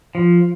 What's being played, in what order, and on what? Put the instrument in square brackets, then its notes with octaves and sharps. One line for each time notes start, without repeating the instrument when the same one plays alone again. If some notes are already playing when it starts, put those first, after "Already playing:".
[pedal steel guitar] F3